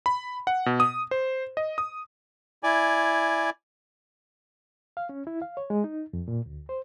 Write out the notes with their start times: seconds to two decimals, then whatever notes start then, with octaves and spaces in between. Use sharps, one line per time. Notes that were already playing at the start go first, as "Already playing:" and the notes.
0.06 B5
0.47 F#5
0.66 B2
0.80 D#6
1.11 C5
1.57 D#5
1.78 D#6
2.63 E4 D5 G#5
4.97 F5
5.09 C#4
5.27 E4
5.42 F5
5.57 C#5
5.70 G#3
5.84 D#4
6.13 F2
6.28 A#2
6.46 D2
6.69 C5